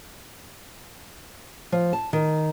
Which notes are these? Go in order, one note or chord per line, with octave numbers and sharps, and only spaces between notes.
F3
A5
D#3